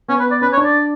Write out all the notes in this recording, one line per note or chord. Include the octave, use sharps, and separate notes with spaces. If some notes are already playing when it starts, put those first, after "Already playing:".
B3 C#4
B4
D5
C#4 B4
C#5
D4
D5